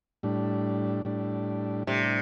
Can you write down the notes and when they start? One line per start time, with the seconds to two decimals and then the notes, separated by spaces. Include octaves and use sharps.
0.23 A2 G3 D4
1.05 A2 G3 D4
1.87 A2 C3 G3 D4